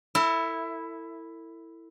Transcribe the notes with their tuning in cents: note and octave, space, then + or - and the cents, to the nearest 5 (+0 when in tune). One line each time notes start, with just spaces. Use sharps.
E4 +0 A4 +40